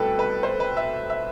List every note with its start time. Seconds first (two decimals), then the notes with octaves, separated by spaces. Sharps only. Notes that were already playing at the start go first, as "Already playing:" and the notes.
Already playing: C2 B2 A3 A4 B4 G5
0.19 B4
0.43 C5
0.60 B4
0.77 E5
1.10 E5